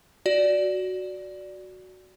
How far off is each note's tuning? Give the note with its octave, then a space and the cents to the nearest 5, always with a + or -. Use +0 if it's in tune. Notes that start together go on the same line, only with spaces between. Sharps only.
F#4 +0 D5 -5